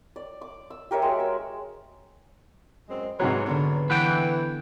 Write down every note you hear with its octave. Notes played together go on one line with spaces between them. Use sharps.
D5
D6
E6
G4 A#4 C#5 E5
G#3 F#4
E6
F#2 G#3 C4
G#2 C3 F#3 G#4 B4 C#5
D3 B3 D4 A#4 C#5
E3 B4 F#5 G5